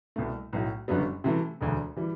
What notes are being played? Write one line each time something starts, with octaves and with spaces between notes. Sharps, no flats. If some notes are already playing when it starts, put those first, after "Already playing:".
C2 B2 A3
B1 A2 F#3
F#1 F#2 D3 G3 B3
C3 E3 A3
E1 D2 D3
E3 G3